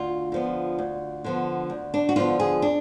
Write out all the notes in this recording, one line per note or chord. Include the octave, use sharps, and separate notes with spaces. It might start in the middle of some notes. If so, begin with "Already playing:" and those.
Already playing: D2 F4
D3 F3 B3
D2
D3 F3 B3
D2
D4
F#4
D3 F3 B3 F4
G#4
D4